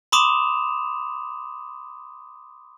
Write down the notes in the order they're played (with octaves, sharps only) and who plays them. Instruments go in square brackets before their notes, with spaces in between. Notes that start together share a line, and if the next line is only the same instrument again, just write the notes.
[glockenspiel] B5 C6 D6 D#6 E7 F7